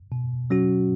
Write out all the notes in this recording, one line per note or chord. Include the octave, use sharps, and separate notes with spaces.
B2
F#3 C#4 F#4